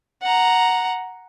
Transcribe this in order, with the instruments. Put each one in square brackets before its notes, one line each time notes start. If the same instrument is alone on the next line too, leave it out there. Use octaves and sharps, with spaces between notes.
[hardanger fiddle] F#5 A#5